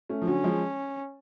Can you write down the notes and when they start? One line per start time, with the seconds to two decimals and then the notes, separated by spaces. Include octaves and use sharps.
0.09 A3 C#4
0.22 F3
0.27 D3 F#3 C#4
0.44 F3 G#3